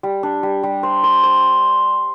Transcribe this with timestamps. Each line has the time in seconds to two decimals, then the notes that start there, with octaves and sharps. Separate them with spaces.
0.03 G3
0.23 D4
0.43 G3
0.63 G3
0.83 C5
1.03 C5
1.23 C5